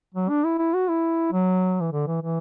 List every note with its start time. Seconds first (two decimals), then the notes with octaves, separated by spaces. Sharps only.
0.15 F#3
0.29 D4
0.44 E4
0.59 E4
0.74 F#4
0.89 E4
1.32 F#3
1.81 E3
1.92 D3
2.07 E3
2.22 E3